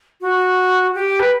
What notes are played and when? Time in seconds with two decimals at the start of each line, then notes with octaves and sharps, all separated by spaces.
0.21 F#4
0.95 G4
1.20 B4